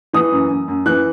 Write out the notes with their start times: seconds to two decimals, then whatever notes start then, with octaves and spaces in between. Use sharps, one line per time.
0.13 E3 D#6
0.32 F#2
0.50 F#2
0.68 F#2
0.86 E3 F#6